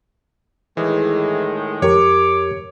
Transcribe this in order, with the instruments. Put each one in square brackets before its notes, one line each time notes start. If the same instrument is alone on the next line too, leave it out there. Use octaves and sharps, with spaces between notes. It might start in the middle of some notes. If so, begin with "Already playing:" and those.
[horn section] A2 D#3 G#3 [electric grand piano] E3
[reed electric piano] F2 G4 A#4 [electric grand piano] C#5 [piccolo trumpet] D6